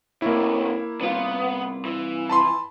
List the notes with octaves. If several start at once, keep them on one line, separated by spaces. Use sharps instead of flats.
A2 C3 A#3 E4
C2 B3 F4
E3
A5 B5 C6